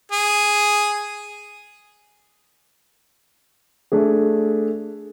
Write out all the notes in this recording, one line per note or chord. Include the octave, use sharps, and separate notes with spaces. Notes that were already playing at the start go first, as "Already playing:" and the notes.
G#4
A3 D4 G#4